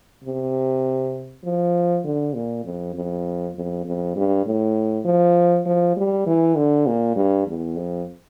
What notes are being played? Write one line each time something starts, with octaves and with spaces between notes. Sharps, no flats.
C3
F3
D3
A#2
F2
F2
F2
F2
G2
A2
F3
F3
G3
E3
D3
A#2
G2
E2
F2